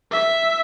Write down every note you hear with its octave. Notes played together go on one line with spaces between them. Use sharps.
E5